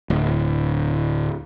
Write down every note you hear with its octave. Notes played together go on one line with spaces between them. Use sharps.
D1